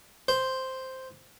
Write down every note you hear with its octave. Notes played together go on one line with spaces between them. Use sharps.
C5